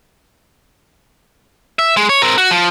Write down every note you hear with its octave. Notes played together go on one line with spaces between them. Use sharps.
E5
G#3
C#5
C4 A#4
F#4
F3